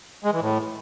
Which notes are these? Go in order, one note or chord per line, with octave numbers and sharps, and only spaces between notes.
G#3
E3
A2